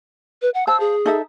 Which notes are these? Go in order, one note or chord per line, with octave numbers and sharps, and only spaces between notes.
B4
F#5
C5 F5 A5 E6
G#4
D#4 A4 E5